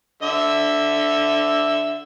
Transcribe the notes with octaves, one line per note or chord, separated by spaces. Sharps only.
D3 E5